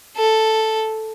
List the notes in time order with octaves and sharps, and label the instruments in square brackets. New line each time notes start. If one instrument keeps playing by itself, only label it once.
[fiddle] A4